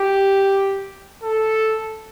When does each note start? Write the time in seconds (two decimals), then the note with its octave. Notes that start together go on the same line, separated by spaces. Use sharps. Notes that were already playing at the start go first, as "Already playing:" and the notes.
Already playing: G4
1.23 A4